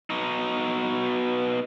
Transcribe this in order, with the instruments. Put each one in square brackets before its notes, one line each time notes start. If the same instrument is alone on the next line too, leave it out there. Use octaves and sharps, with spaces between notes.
[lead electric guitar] B2 D#4